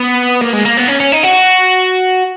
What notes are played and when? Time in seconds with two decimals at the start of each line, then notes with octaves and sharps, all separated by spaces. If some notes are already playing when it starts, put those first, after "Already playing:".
Already playing: B3
0.41 A#3
0.53 G#3
0.65 A#3
0.77 B3
0.88 C#4
1.00 C#4
1.12 D#4
1.23 F#4